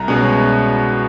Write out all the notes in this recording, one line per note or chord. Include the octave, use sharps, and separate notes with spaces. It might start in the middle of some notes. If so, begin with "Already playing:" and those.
Already playing: C2 A#5
B2 G#3 C#4